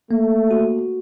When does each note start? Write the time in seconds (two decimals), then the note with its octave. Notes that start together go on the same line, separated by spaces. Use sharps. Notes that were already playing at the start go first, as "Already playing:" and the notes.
0.11 A3 A#3
0.51 F#4